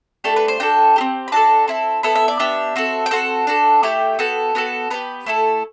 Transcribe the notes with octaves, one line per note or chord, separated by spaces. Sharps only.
A3 D4 G4 A4
B4
C5
D4 F#4 A4 G5
C4 E4 G4
B5
D4 F#4 A4 A5
C4 E4 A4
B3 E4 A4 B5
E5
D5
B3 D4 G4 E5
C4 F#4 A4
G5
C4 F#4 A4 F#5
D4 F#4 A4
A3 E4 G4 G5
B3 F#4 A4
B3 F#4 A4
B3 D4 G4 B4
A3 E4 A4